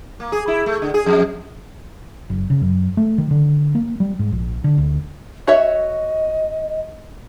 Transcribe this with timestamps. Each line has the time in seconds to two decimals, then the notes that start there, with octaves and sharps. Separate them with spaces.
0.20 A#3
0.32 G#4
0.48 E4
0.66 A3
0.82 D3
0.94 G#4
1.06 F2
2.30 F#1
2.50 C#3
2.62 F#2
2.97 A3
3.18 D#3
3.31 D3
3.75 A#3
4.00 G3
4.19 G#2
4.32 A#1
4.64 D3
4.78 D2
5.47 F#4 C#5 D#5 E5